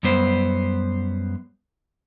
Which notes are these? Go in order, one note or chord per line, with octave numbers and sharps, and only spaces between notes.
F#2 G3 B3 C5